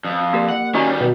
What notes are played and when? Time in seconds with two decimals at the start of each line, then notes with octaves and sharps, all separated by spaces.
0.05 F2
0.33 A#3 G4 A#4
0.48 F#5
0.74 D#3 G3 C#4 F#4 D#5 A#5
1.01 B2